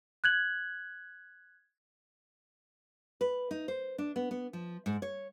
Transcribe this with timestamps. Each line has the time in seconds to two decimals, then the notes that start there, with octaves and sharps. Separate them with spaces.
0.24 F#6 G#6 F#7
3.21 B4
3.51 D#4
3.68 C5
3.98 D4
4.16 B3
4.31 B3
4.53 F3
4.86 G#2
5.02 C#5